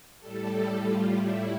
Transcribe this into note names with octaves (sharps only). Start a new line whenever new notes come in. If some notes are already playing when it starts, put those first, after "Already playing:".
A2 G3 A4
F4
E4